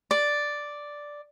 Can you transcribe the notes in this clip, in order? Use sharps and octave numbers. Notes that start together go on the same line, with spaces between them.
D5